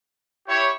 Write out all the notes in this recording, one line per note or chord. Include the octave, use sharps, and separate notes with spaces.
E4 G4 C#5